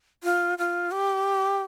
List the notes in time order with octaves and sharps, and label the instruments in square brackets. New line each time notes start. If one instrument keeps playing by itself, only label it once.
[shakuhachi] F4
F4
G4